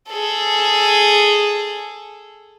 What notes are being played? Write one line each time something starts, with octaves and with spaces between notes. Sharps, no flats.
G#4 A4